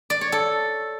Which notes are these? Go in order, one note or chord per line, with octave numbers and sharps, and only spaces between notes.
D5
C#5
A4